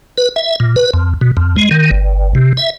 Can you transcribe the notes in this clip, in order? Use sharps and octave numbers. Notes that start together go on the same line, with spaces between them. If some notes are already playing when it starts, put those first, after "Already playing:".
B4
E5
A#2
B4
F2
B2
F2
G#3
D#3
G1
C3
E5